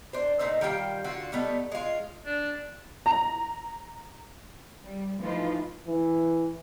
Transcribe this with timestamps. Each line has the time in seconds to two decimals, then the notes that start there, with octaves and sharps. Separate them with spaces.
0.13 D4 C5
0.39 A#2 A3 D#4 C5
0.61 D#3 G3 F4 G5
1.04 D3 F4 F#4
1.32 G3 A3 B3 D#4
1.72 G#3 F4
2.26 D4
3.06 A#5
4.83 G3
5.20 E3 F3 A3 D#4 F4 B4
5.87 E3